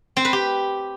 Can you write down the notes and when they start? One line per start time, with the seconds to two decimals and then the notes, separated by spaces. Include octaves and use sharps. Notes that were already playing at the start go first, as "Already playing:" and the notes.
0.17 C4
0.25 B4
0.33 G4